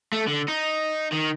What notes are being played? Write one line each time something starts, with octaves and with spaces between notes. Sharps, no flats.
A3
D3
D#4
D#3